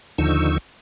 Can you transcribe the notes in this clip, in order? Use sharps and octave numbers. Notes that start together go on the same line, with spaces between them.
D#2 D3 F3 D#4 C#6 E6